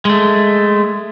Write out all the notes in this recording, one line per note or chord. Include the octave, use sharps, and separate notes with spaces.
G#3 A3